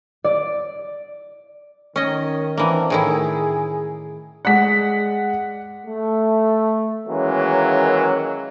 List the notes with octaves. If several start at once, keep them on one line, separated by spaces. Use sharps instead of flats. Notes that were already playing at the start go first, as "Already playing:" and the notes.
D5
D#3 C#4 D#5
E3 A#3 C4 D4
A2 D#3 E4 G#4
G#3 D5 F#5 B6
A3
D#3 E3 F#3 G#3 A#3 C#4